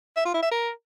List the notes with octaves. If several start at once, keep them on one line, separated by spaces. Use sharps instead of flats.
E5
F4
E4
E5
A#4